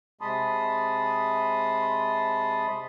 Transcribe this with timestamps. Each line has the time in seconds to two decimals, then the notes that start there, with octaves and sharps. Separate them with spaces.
0.21 C3 G#3 A5 B5 C6 D#6